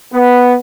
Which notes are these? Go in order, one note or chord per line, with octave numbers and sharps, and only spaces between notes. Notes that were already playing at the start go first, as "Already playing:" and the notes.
B3